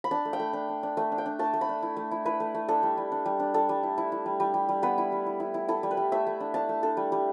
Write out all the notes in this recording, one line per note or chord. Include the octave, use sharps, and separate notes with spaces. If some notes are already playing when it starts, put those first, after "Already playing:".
B5
D4 A5
A3
G5
A3
D4
D4
D4
A3 E5
D4
G5
D4
A3 A5
A3
B5
D4
E4
A3
E4
E4 B4
A3
A3
D4 A4
G3
G3
D4
G3
D4
G3 A4
G3
E4
E4
E4
G3
G3
G3
G3
B3 B4
E4
G3
E4
E4
E4
E4 A4
G3
B4
G3
A3 E5
A3
D4
D4 A5
A3
D4 A4
G3
G3